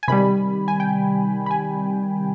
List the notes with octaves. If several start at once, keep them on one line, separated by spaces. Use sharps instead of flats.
G#5
C3 D#3 G3 B5
G#5
G5
B5
G#5